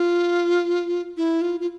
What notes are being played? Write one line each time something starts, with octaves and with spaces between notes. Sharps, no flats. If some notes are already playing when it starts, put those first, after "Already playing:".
Already playing: F4
E4
F4
F4